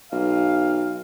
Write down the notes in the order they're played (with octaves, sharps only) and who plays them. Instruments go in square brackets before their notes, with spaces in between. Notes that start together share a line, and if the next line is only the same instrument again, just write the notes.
[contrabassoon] B1 [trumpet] F5